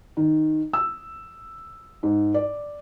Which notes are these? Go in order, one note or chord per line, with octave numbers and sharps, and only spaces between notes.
D#3
E6
G#2
D5